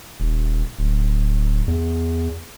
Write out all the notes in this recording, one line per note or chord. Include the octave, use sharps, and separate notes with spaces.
D#1
D1
E2